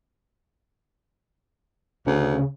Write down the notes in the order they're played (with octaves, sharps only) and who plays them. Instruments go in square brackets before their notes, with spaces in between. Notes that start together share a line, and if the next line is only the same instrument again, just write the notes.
[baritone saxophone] D2 [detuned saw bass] C#3